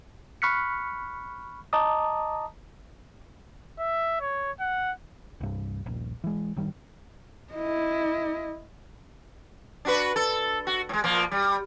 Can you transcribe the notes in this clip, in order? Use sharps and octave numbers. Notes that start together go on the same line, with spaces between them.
B5 C#6 F6 F#6 B6 C#7
D#5 A5 A#5 D6 D#6
E5
C#5
F#5
C2 G2
D#1 A#1
E3 G#3
G#1 D#3 G3
E4 D#5
D4 F#4 B4
A4
F#4
A2 G#3
A#2 F3 A#3
G3